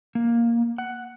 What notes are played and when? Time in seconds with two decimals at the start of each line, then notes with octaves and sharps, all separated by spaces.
0.15 A#3
0.78 F#5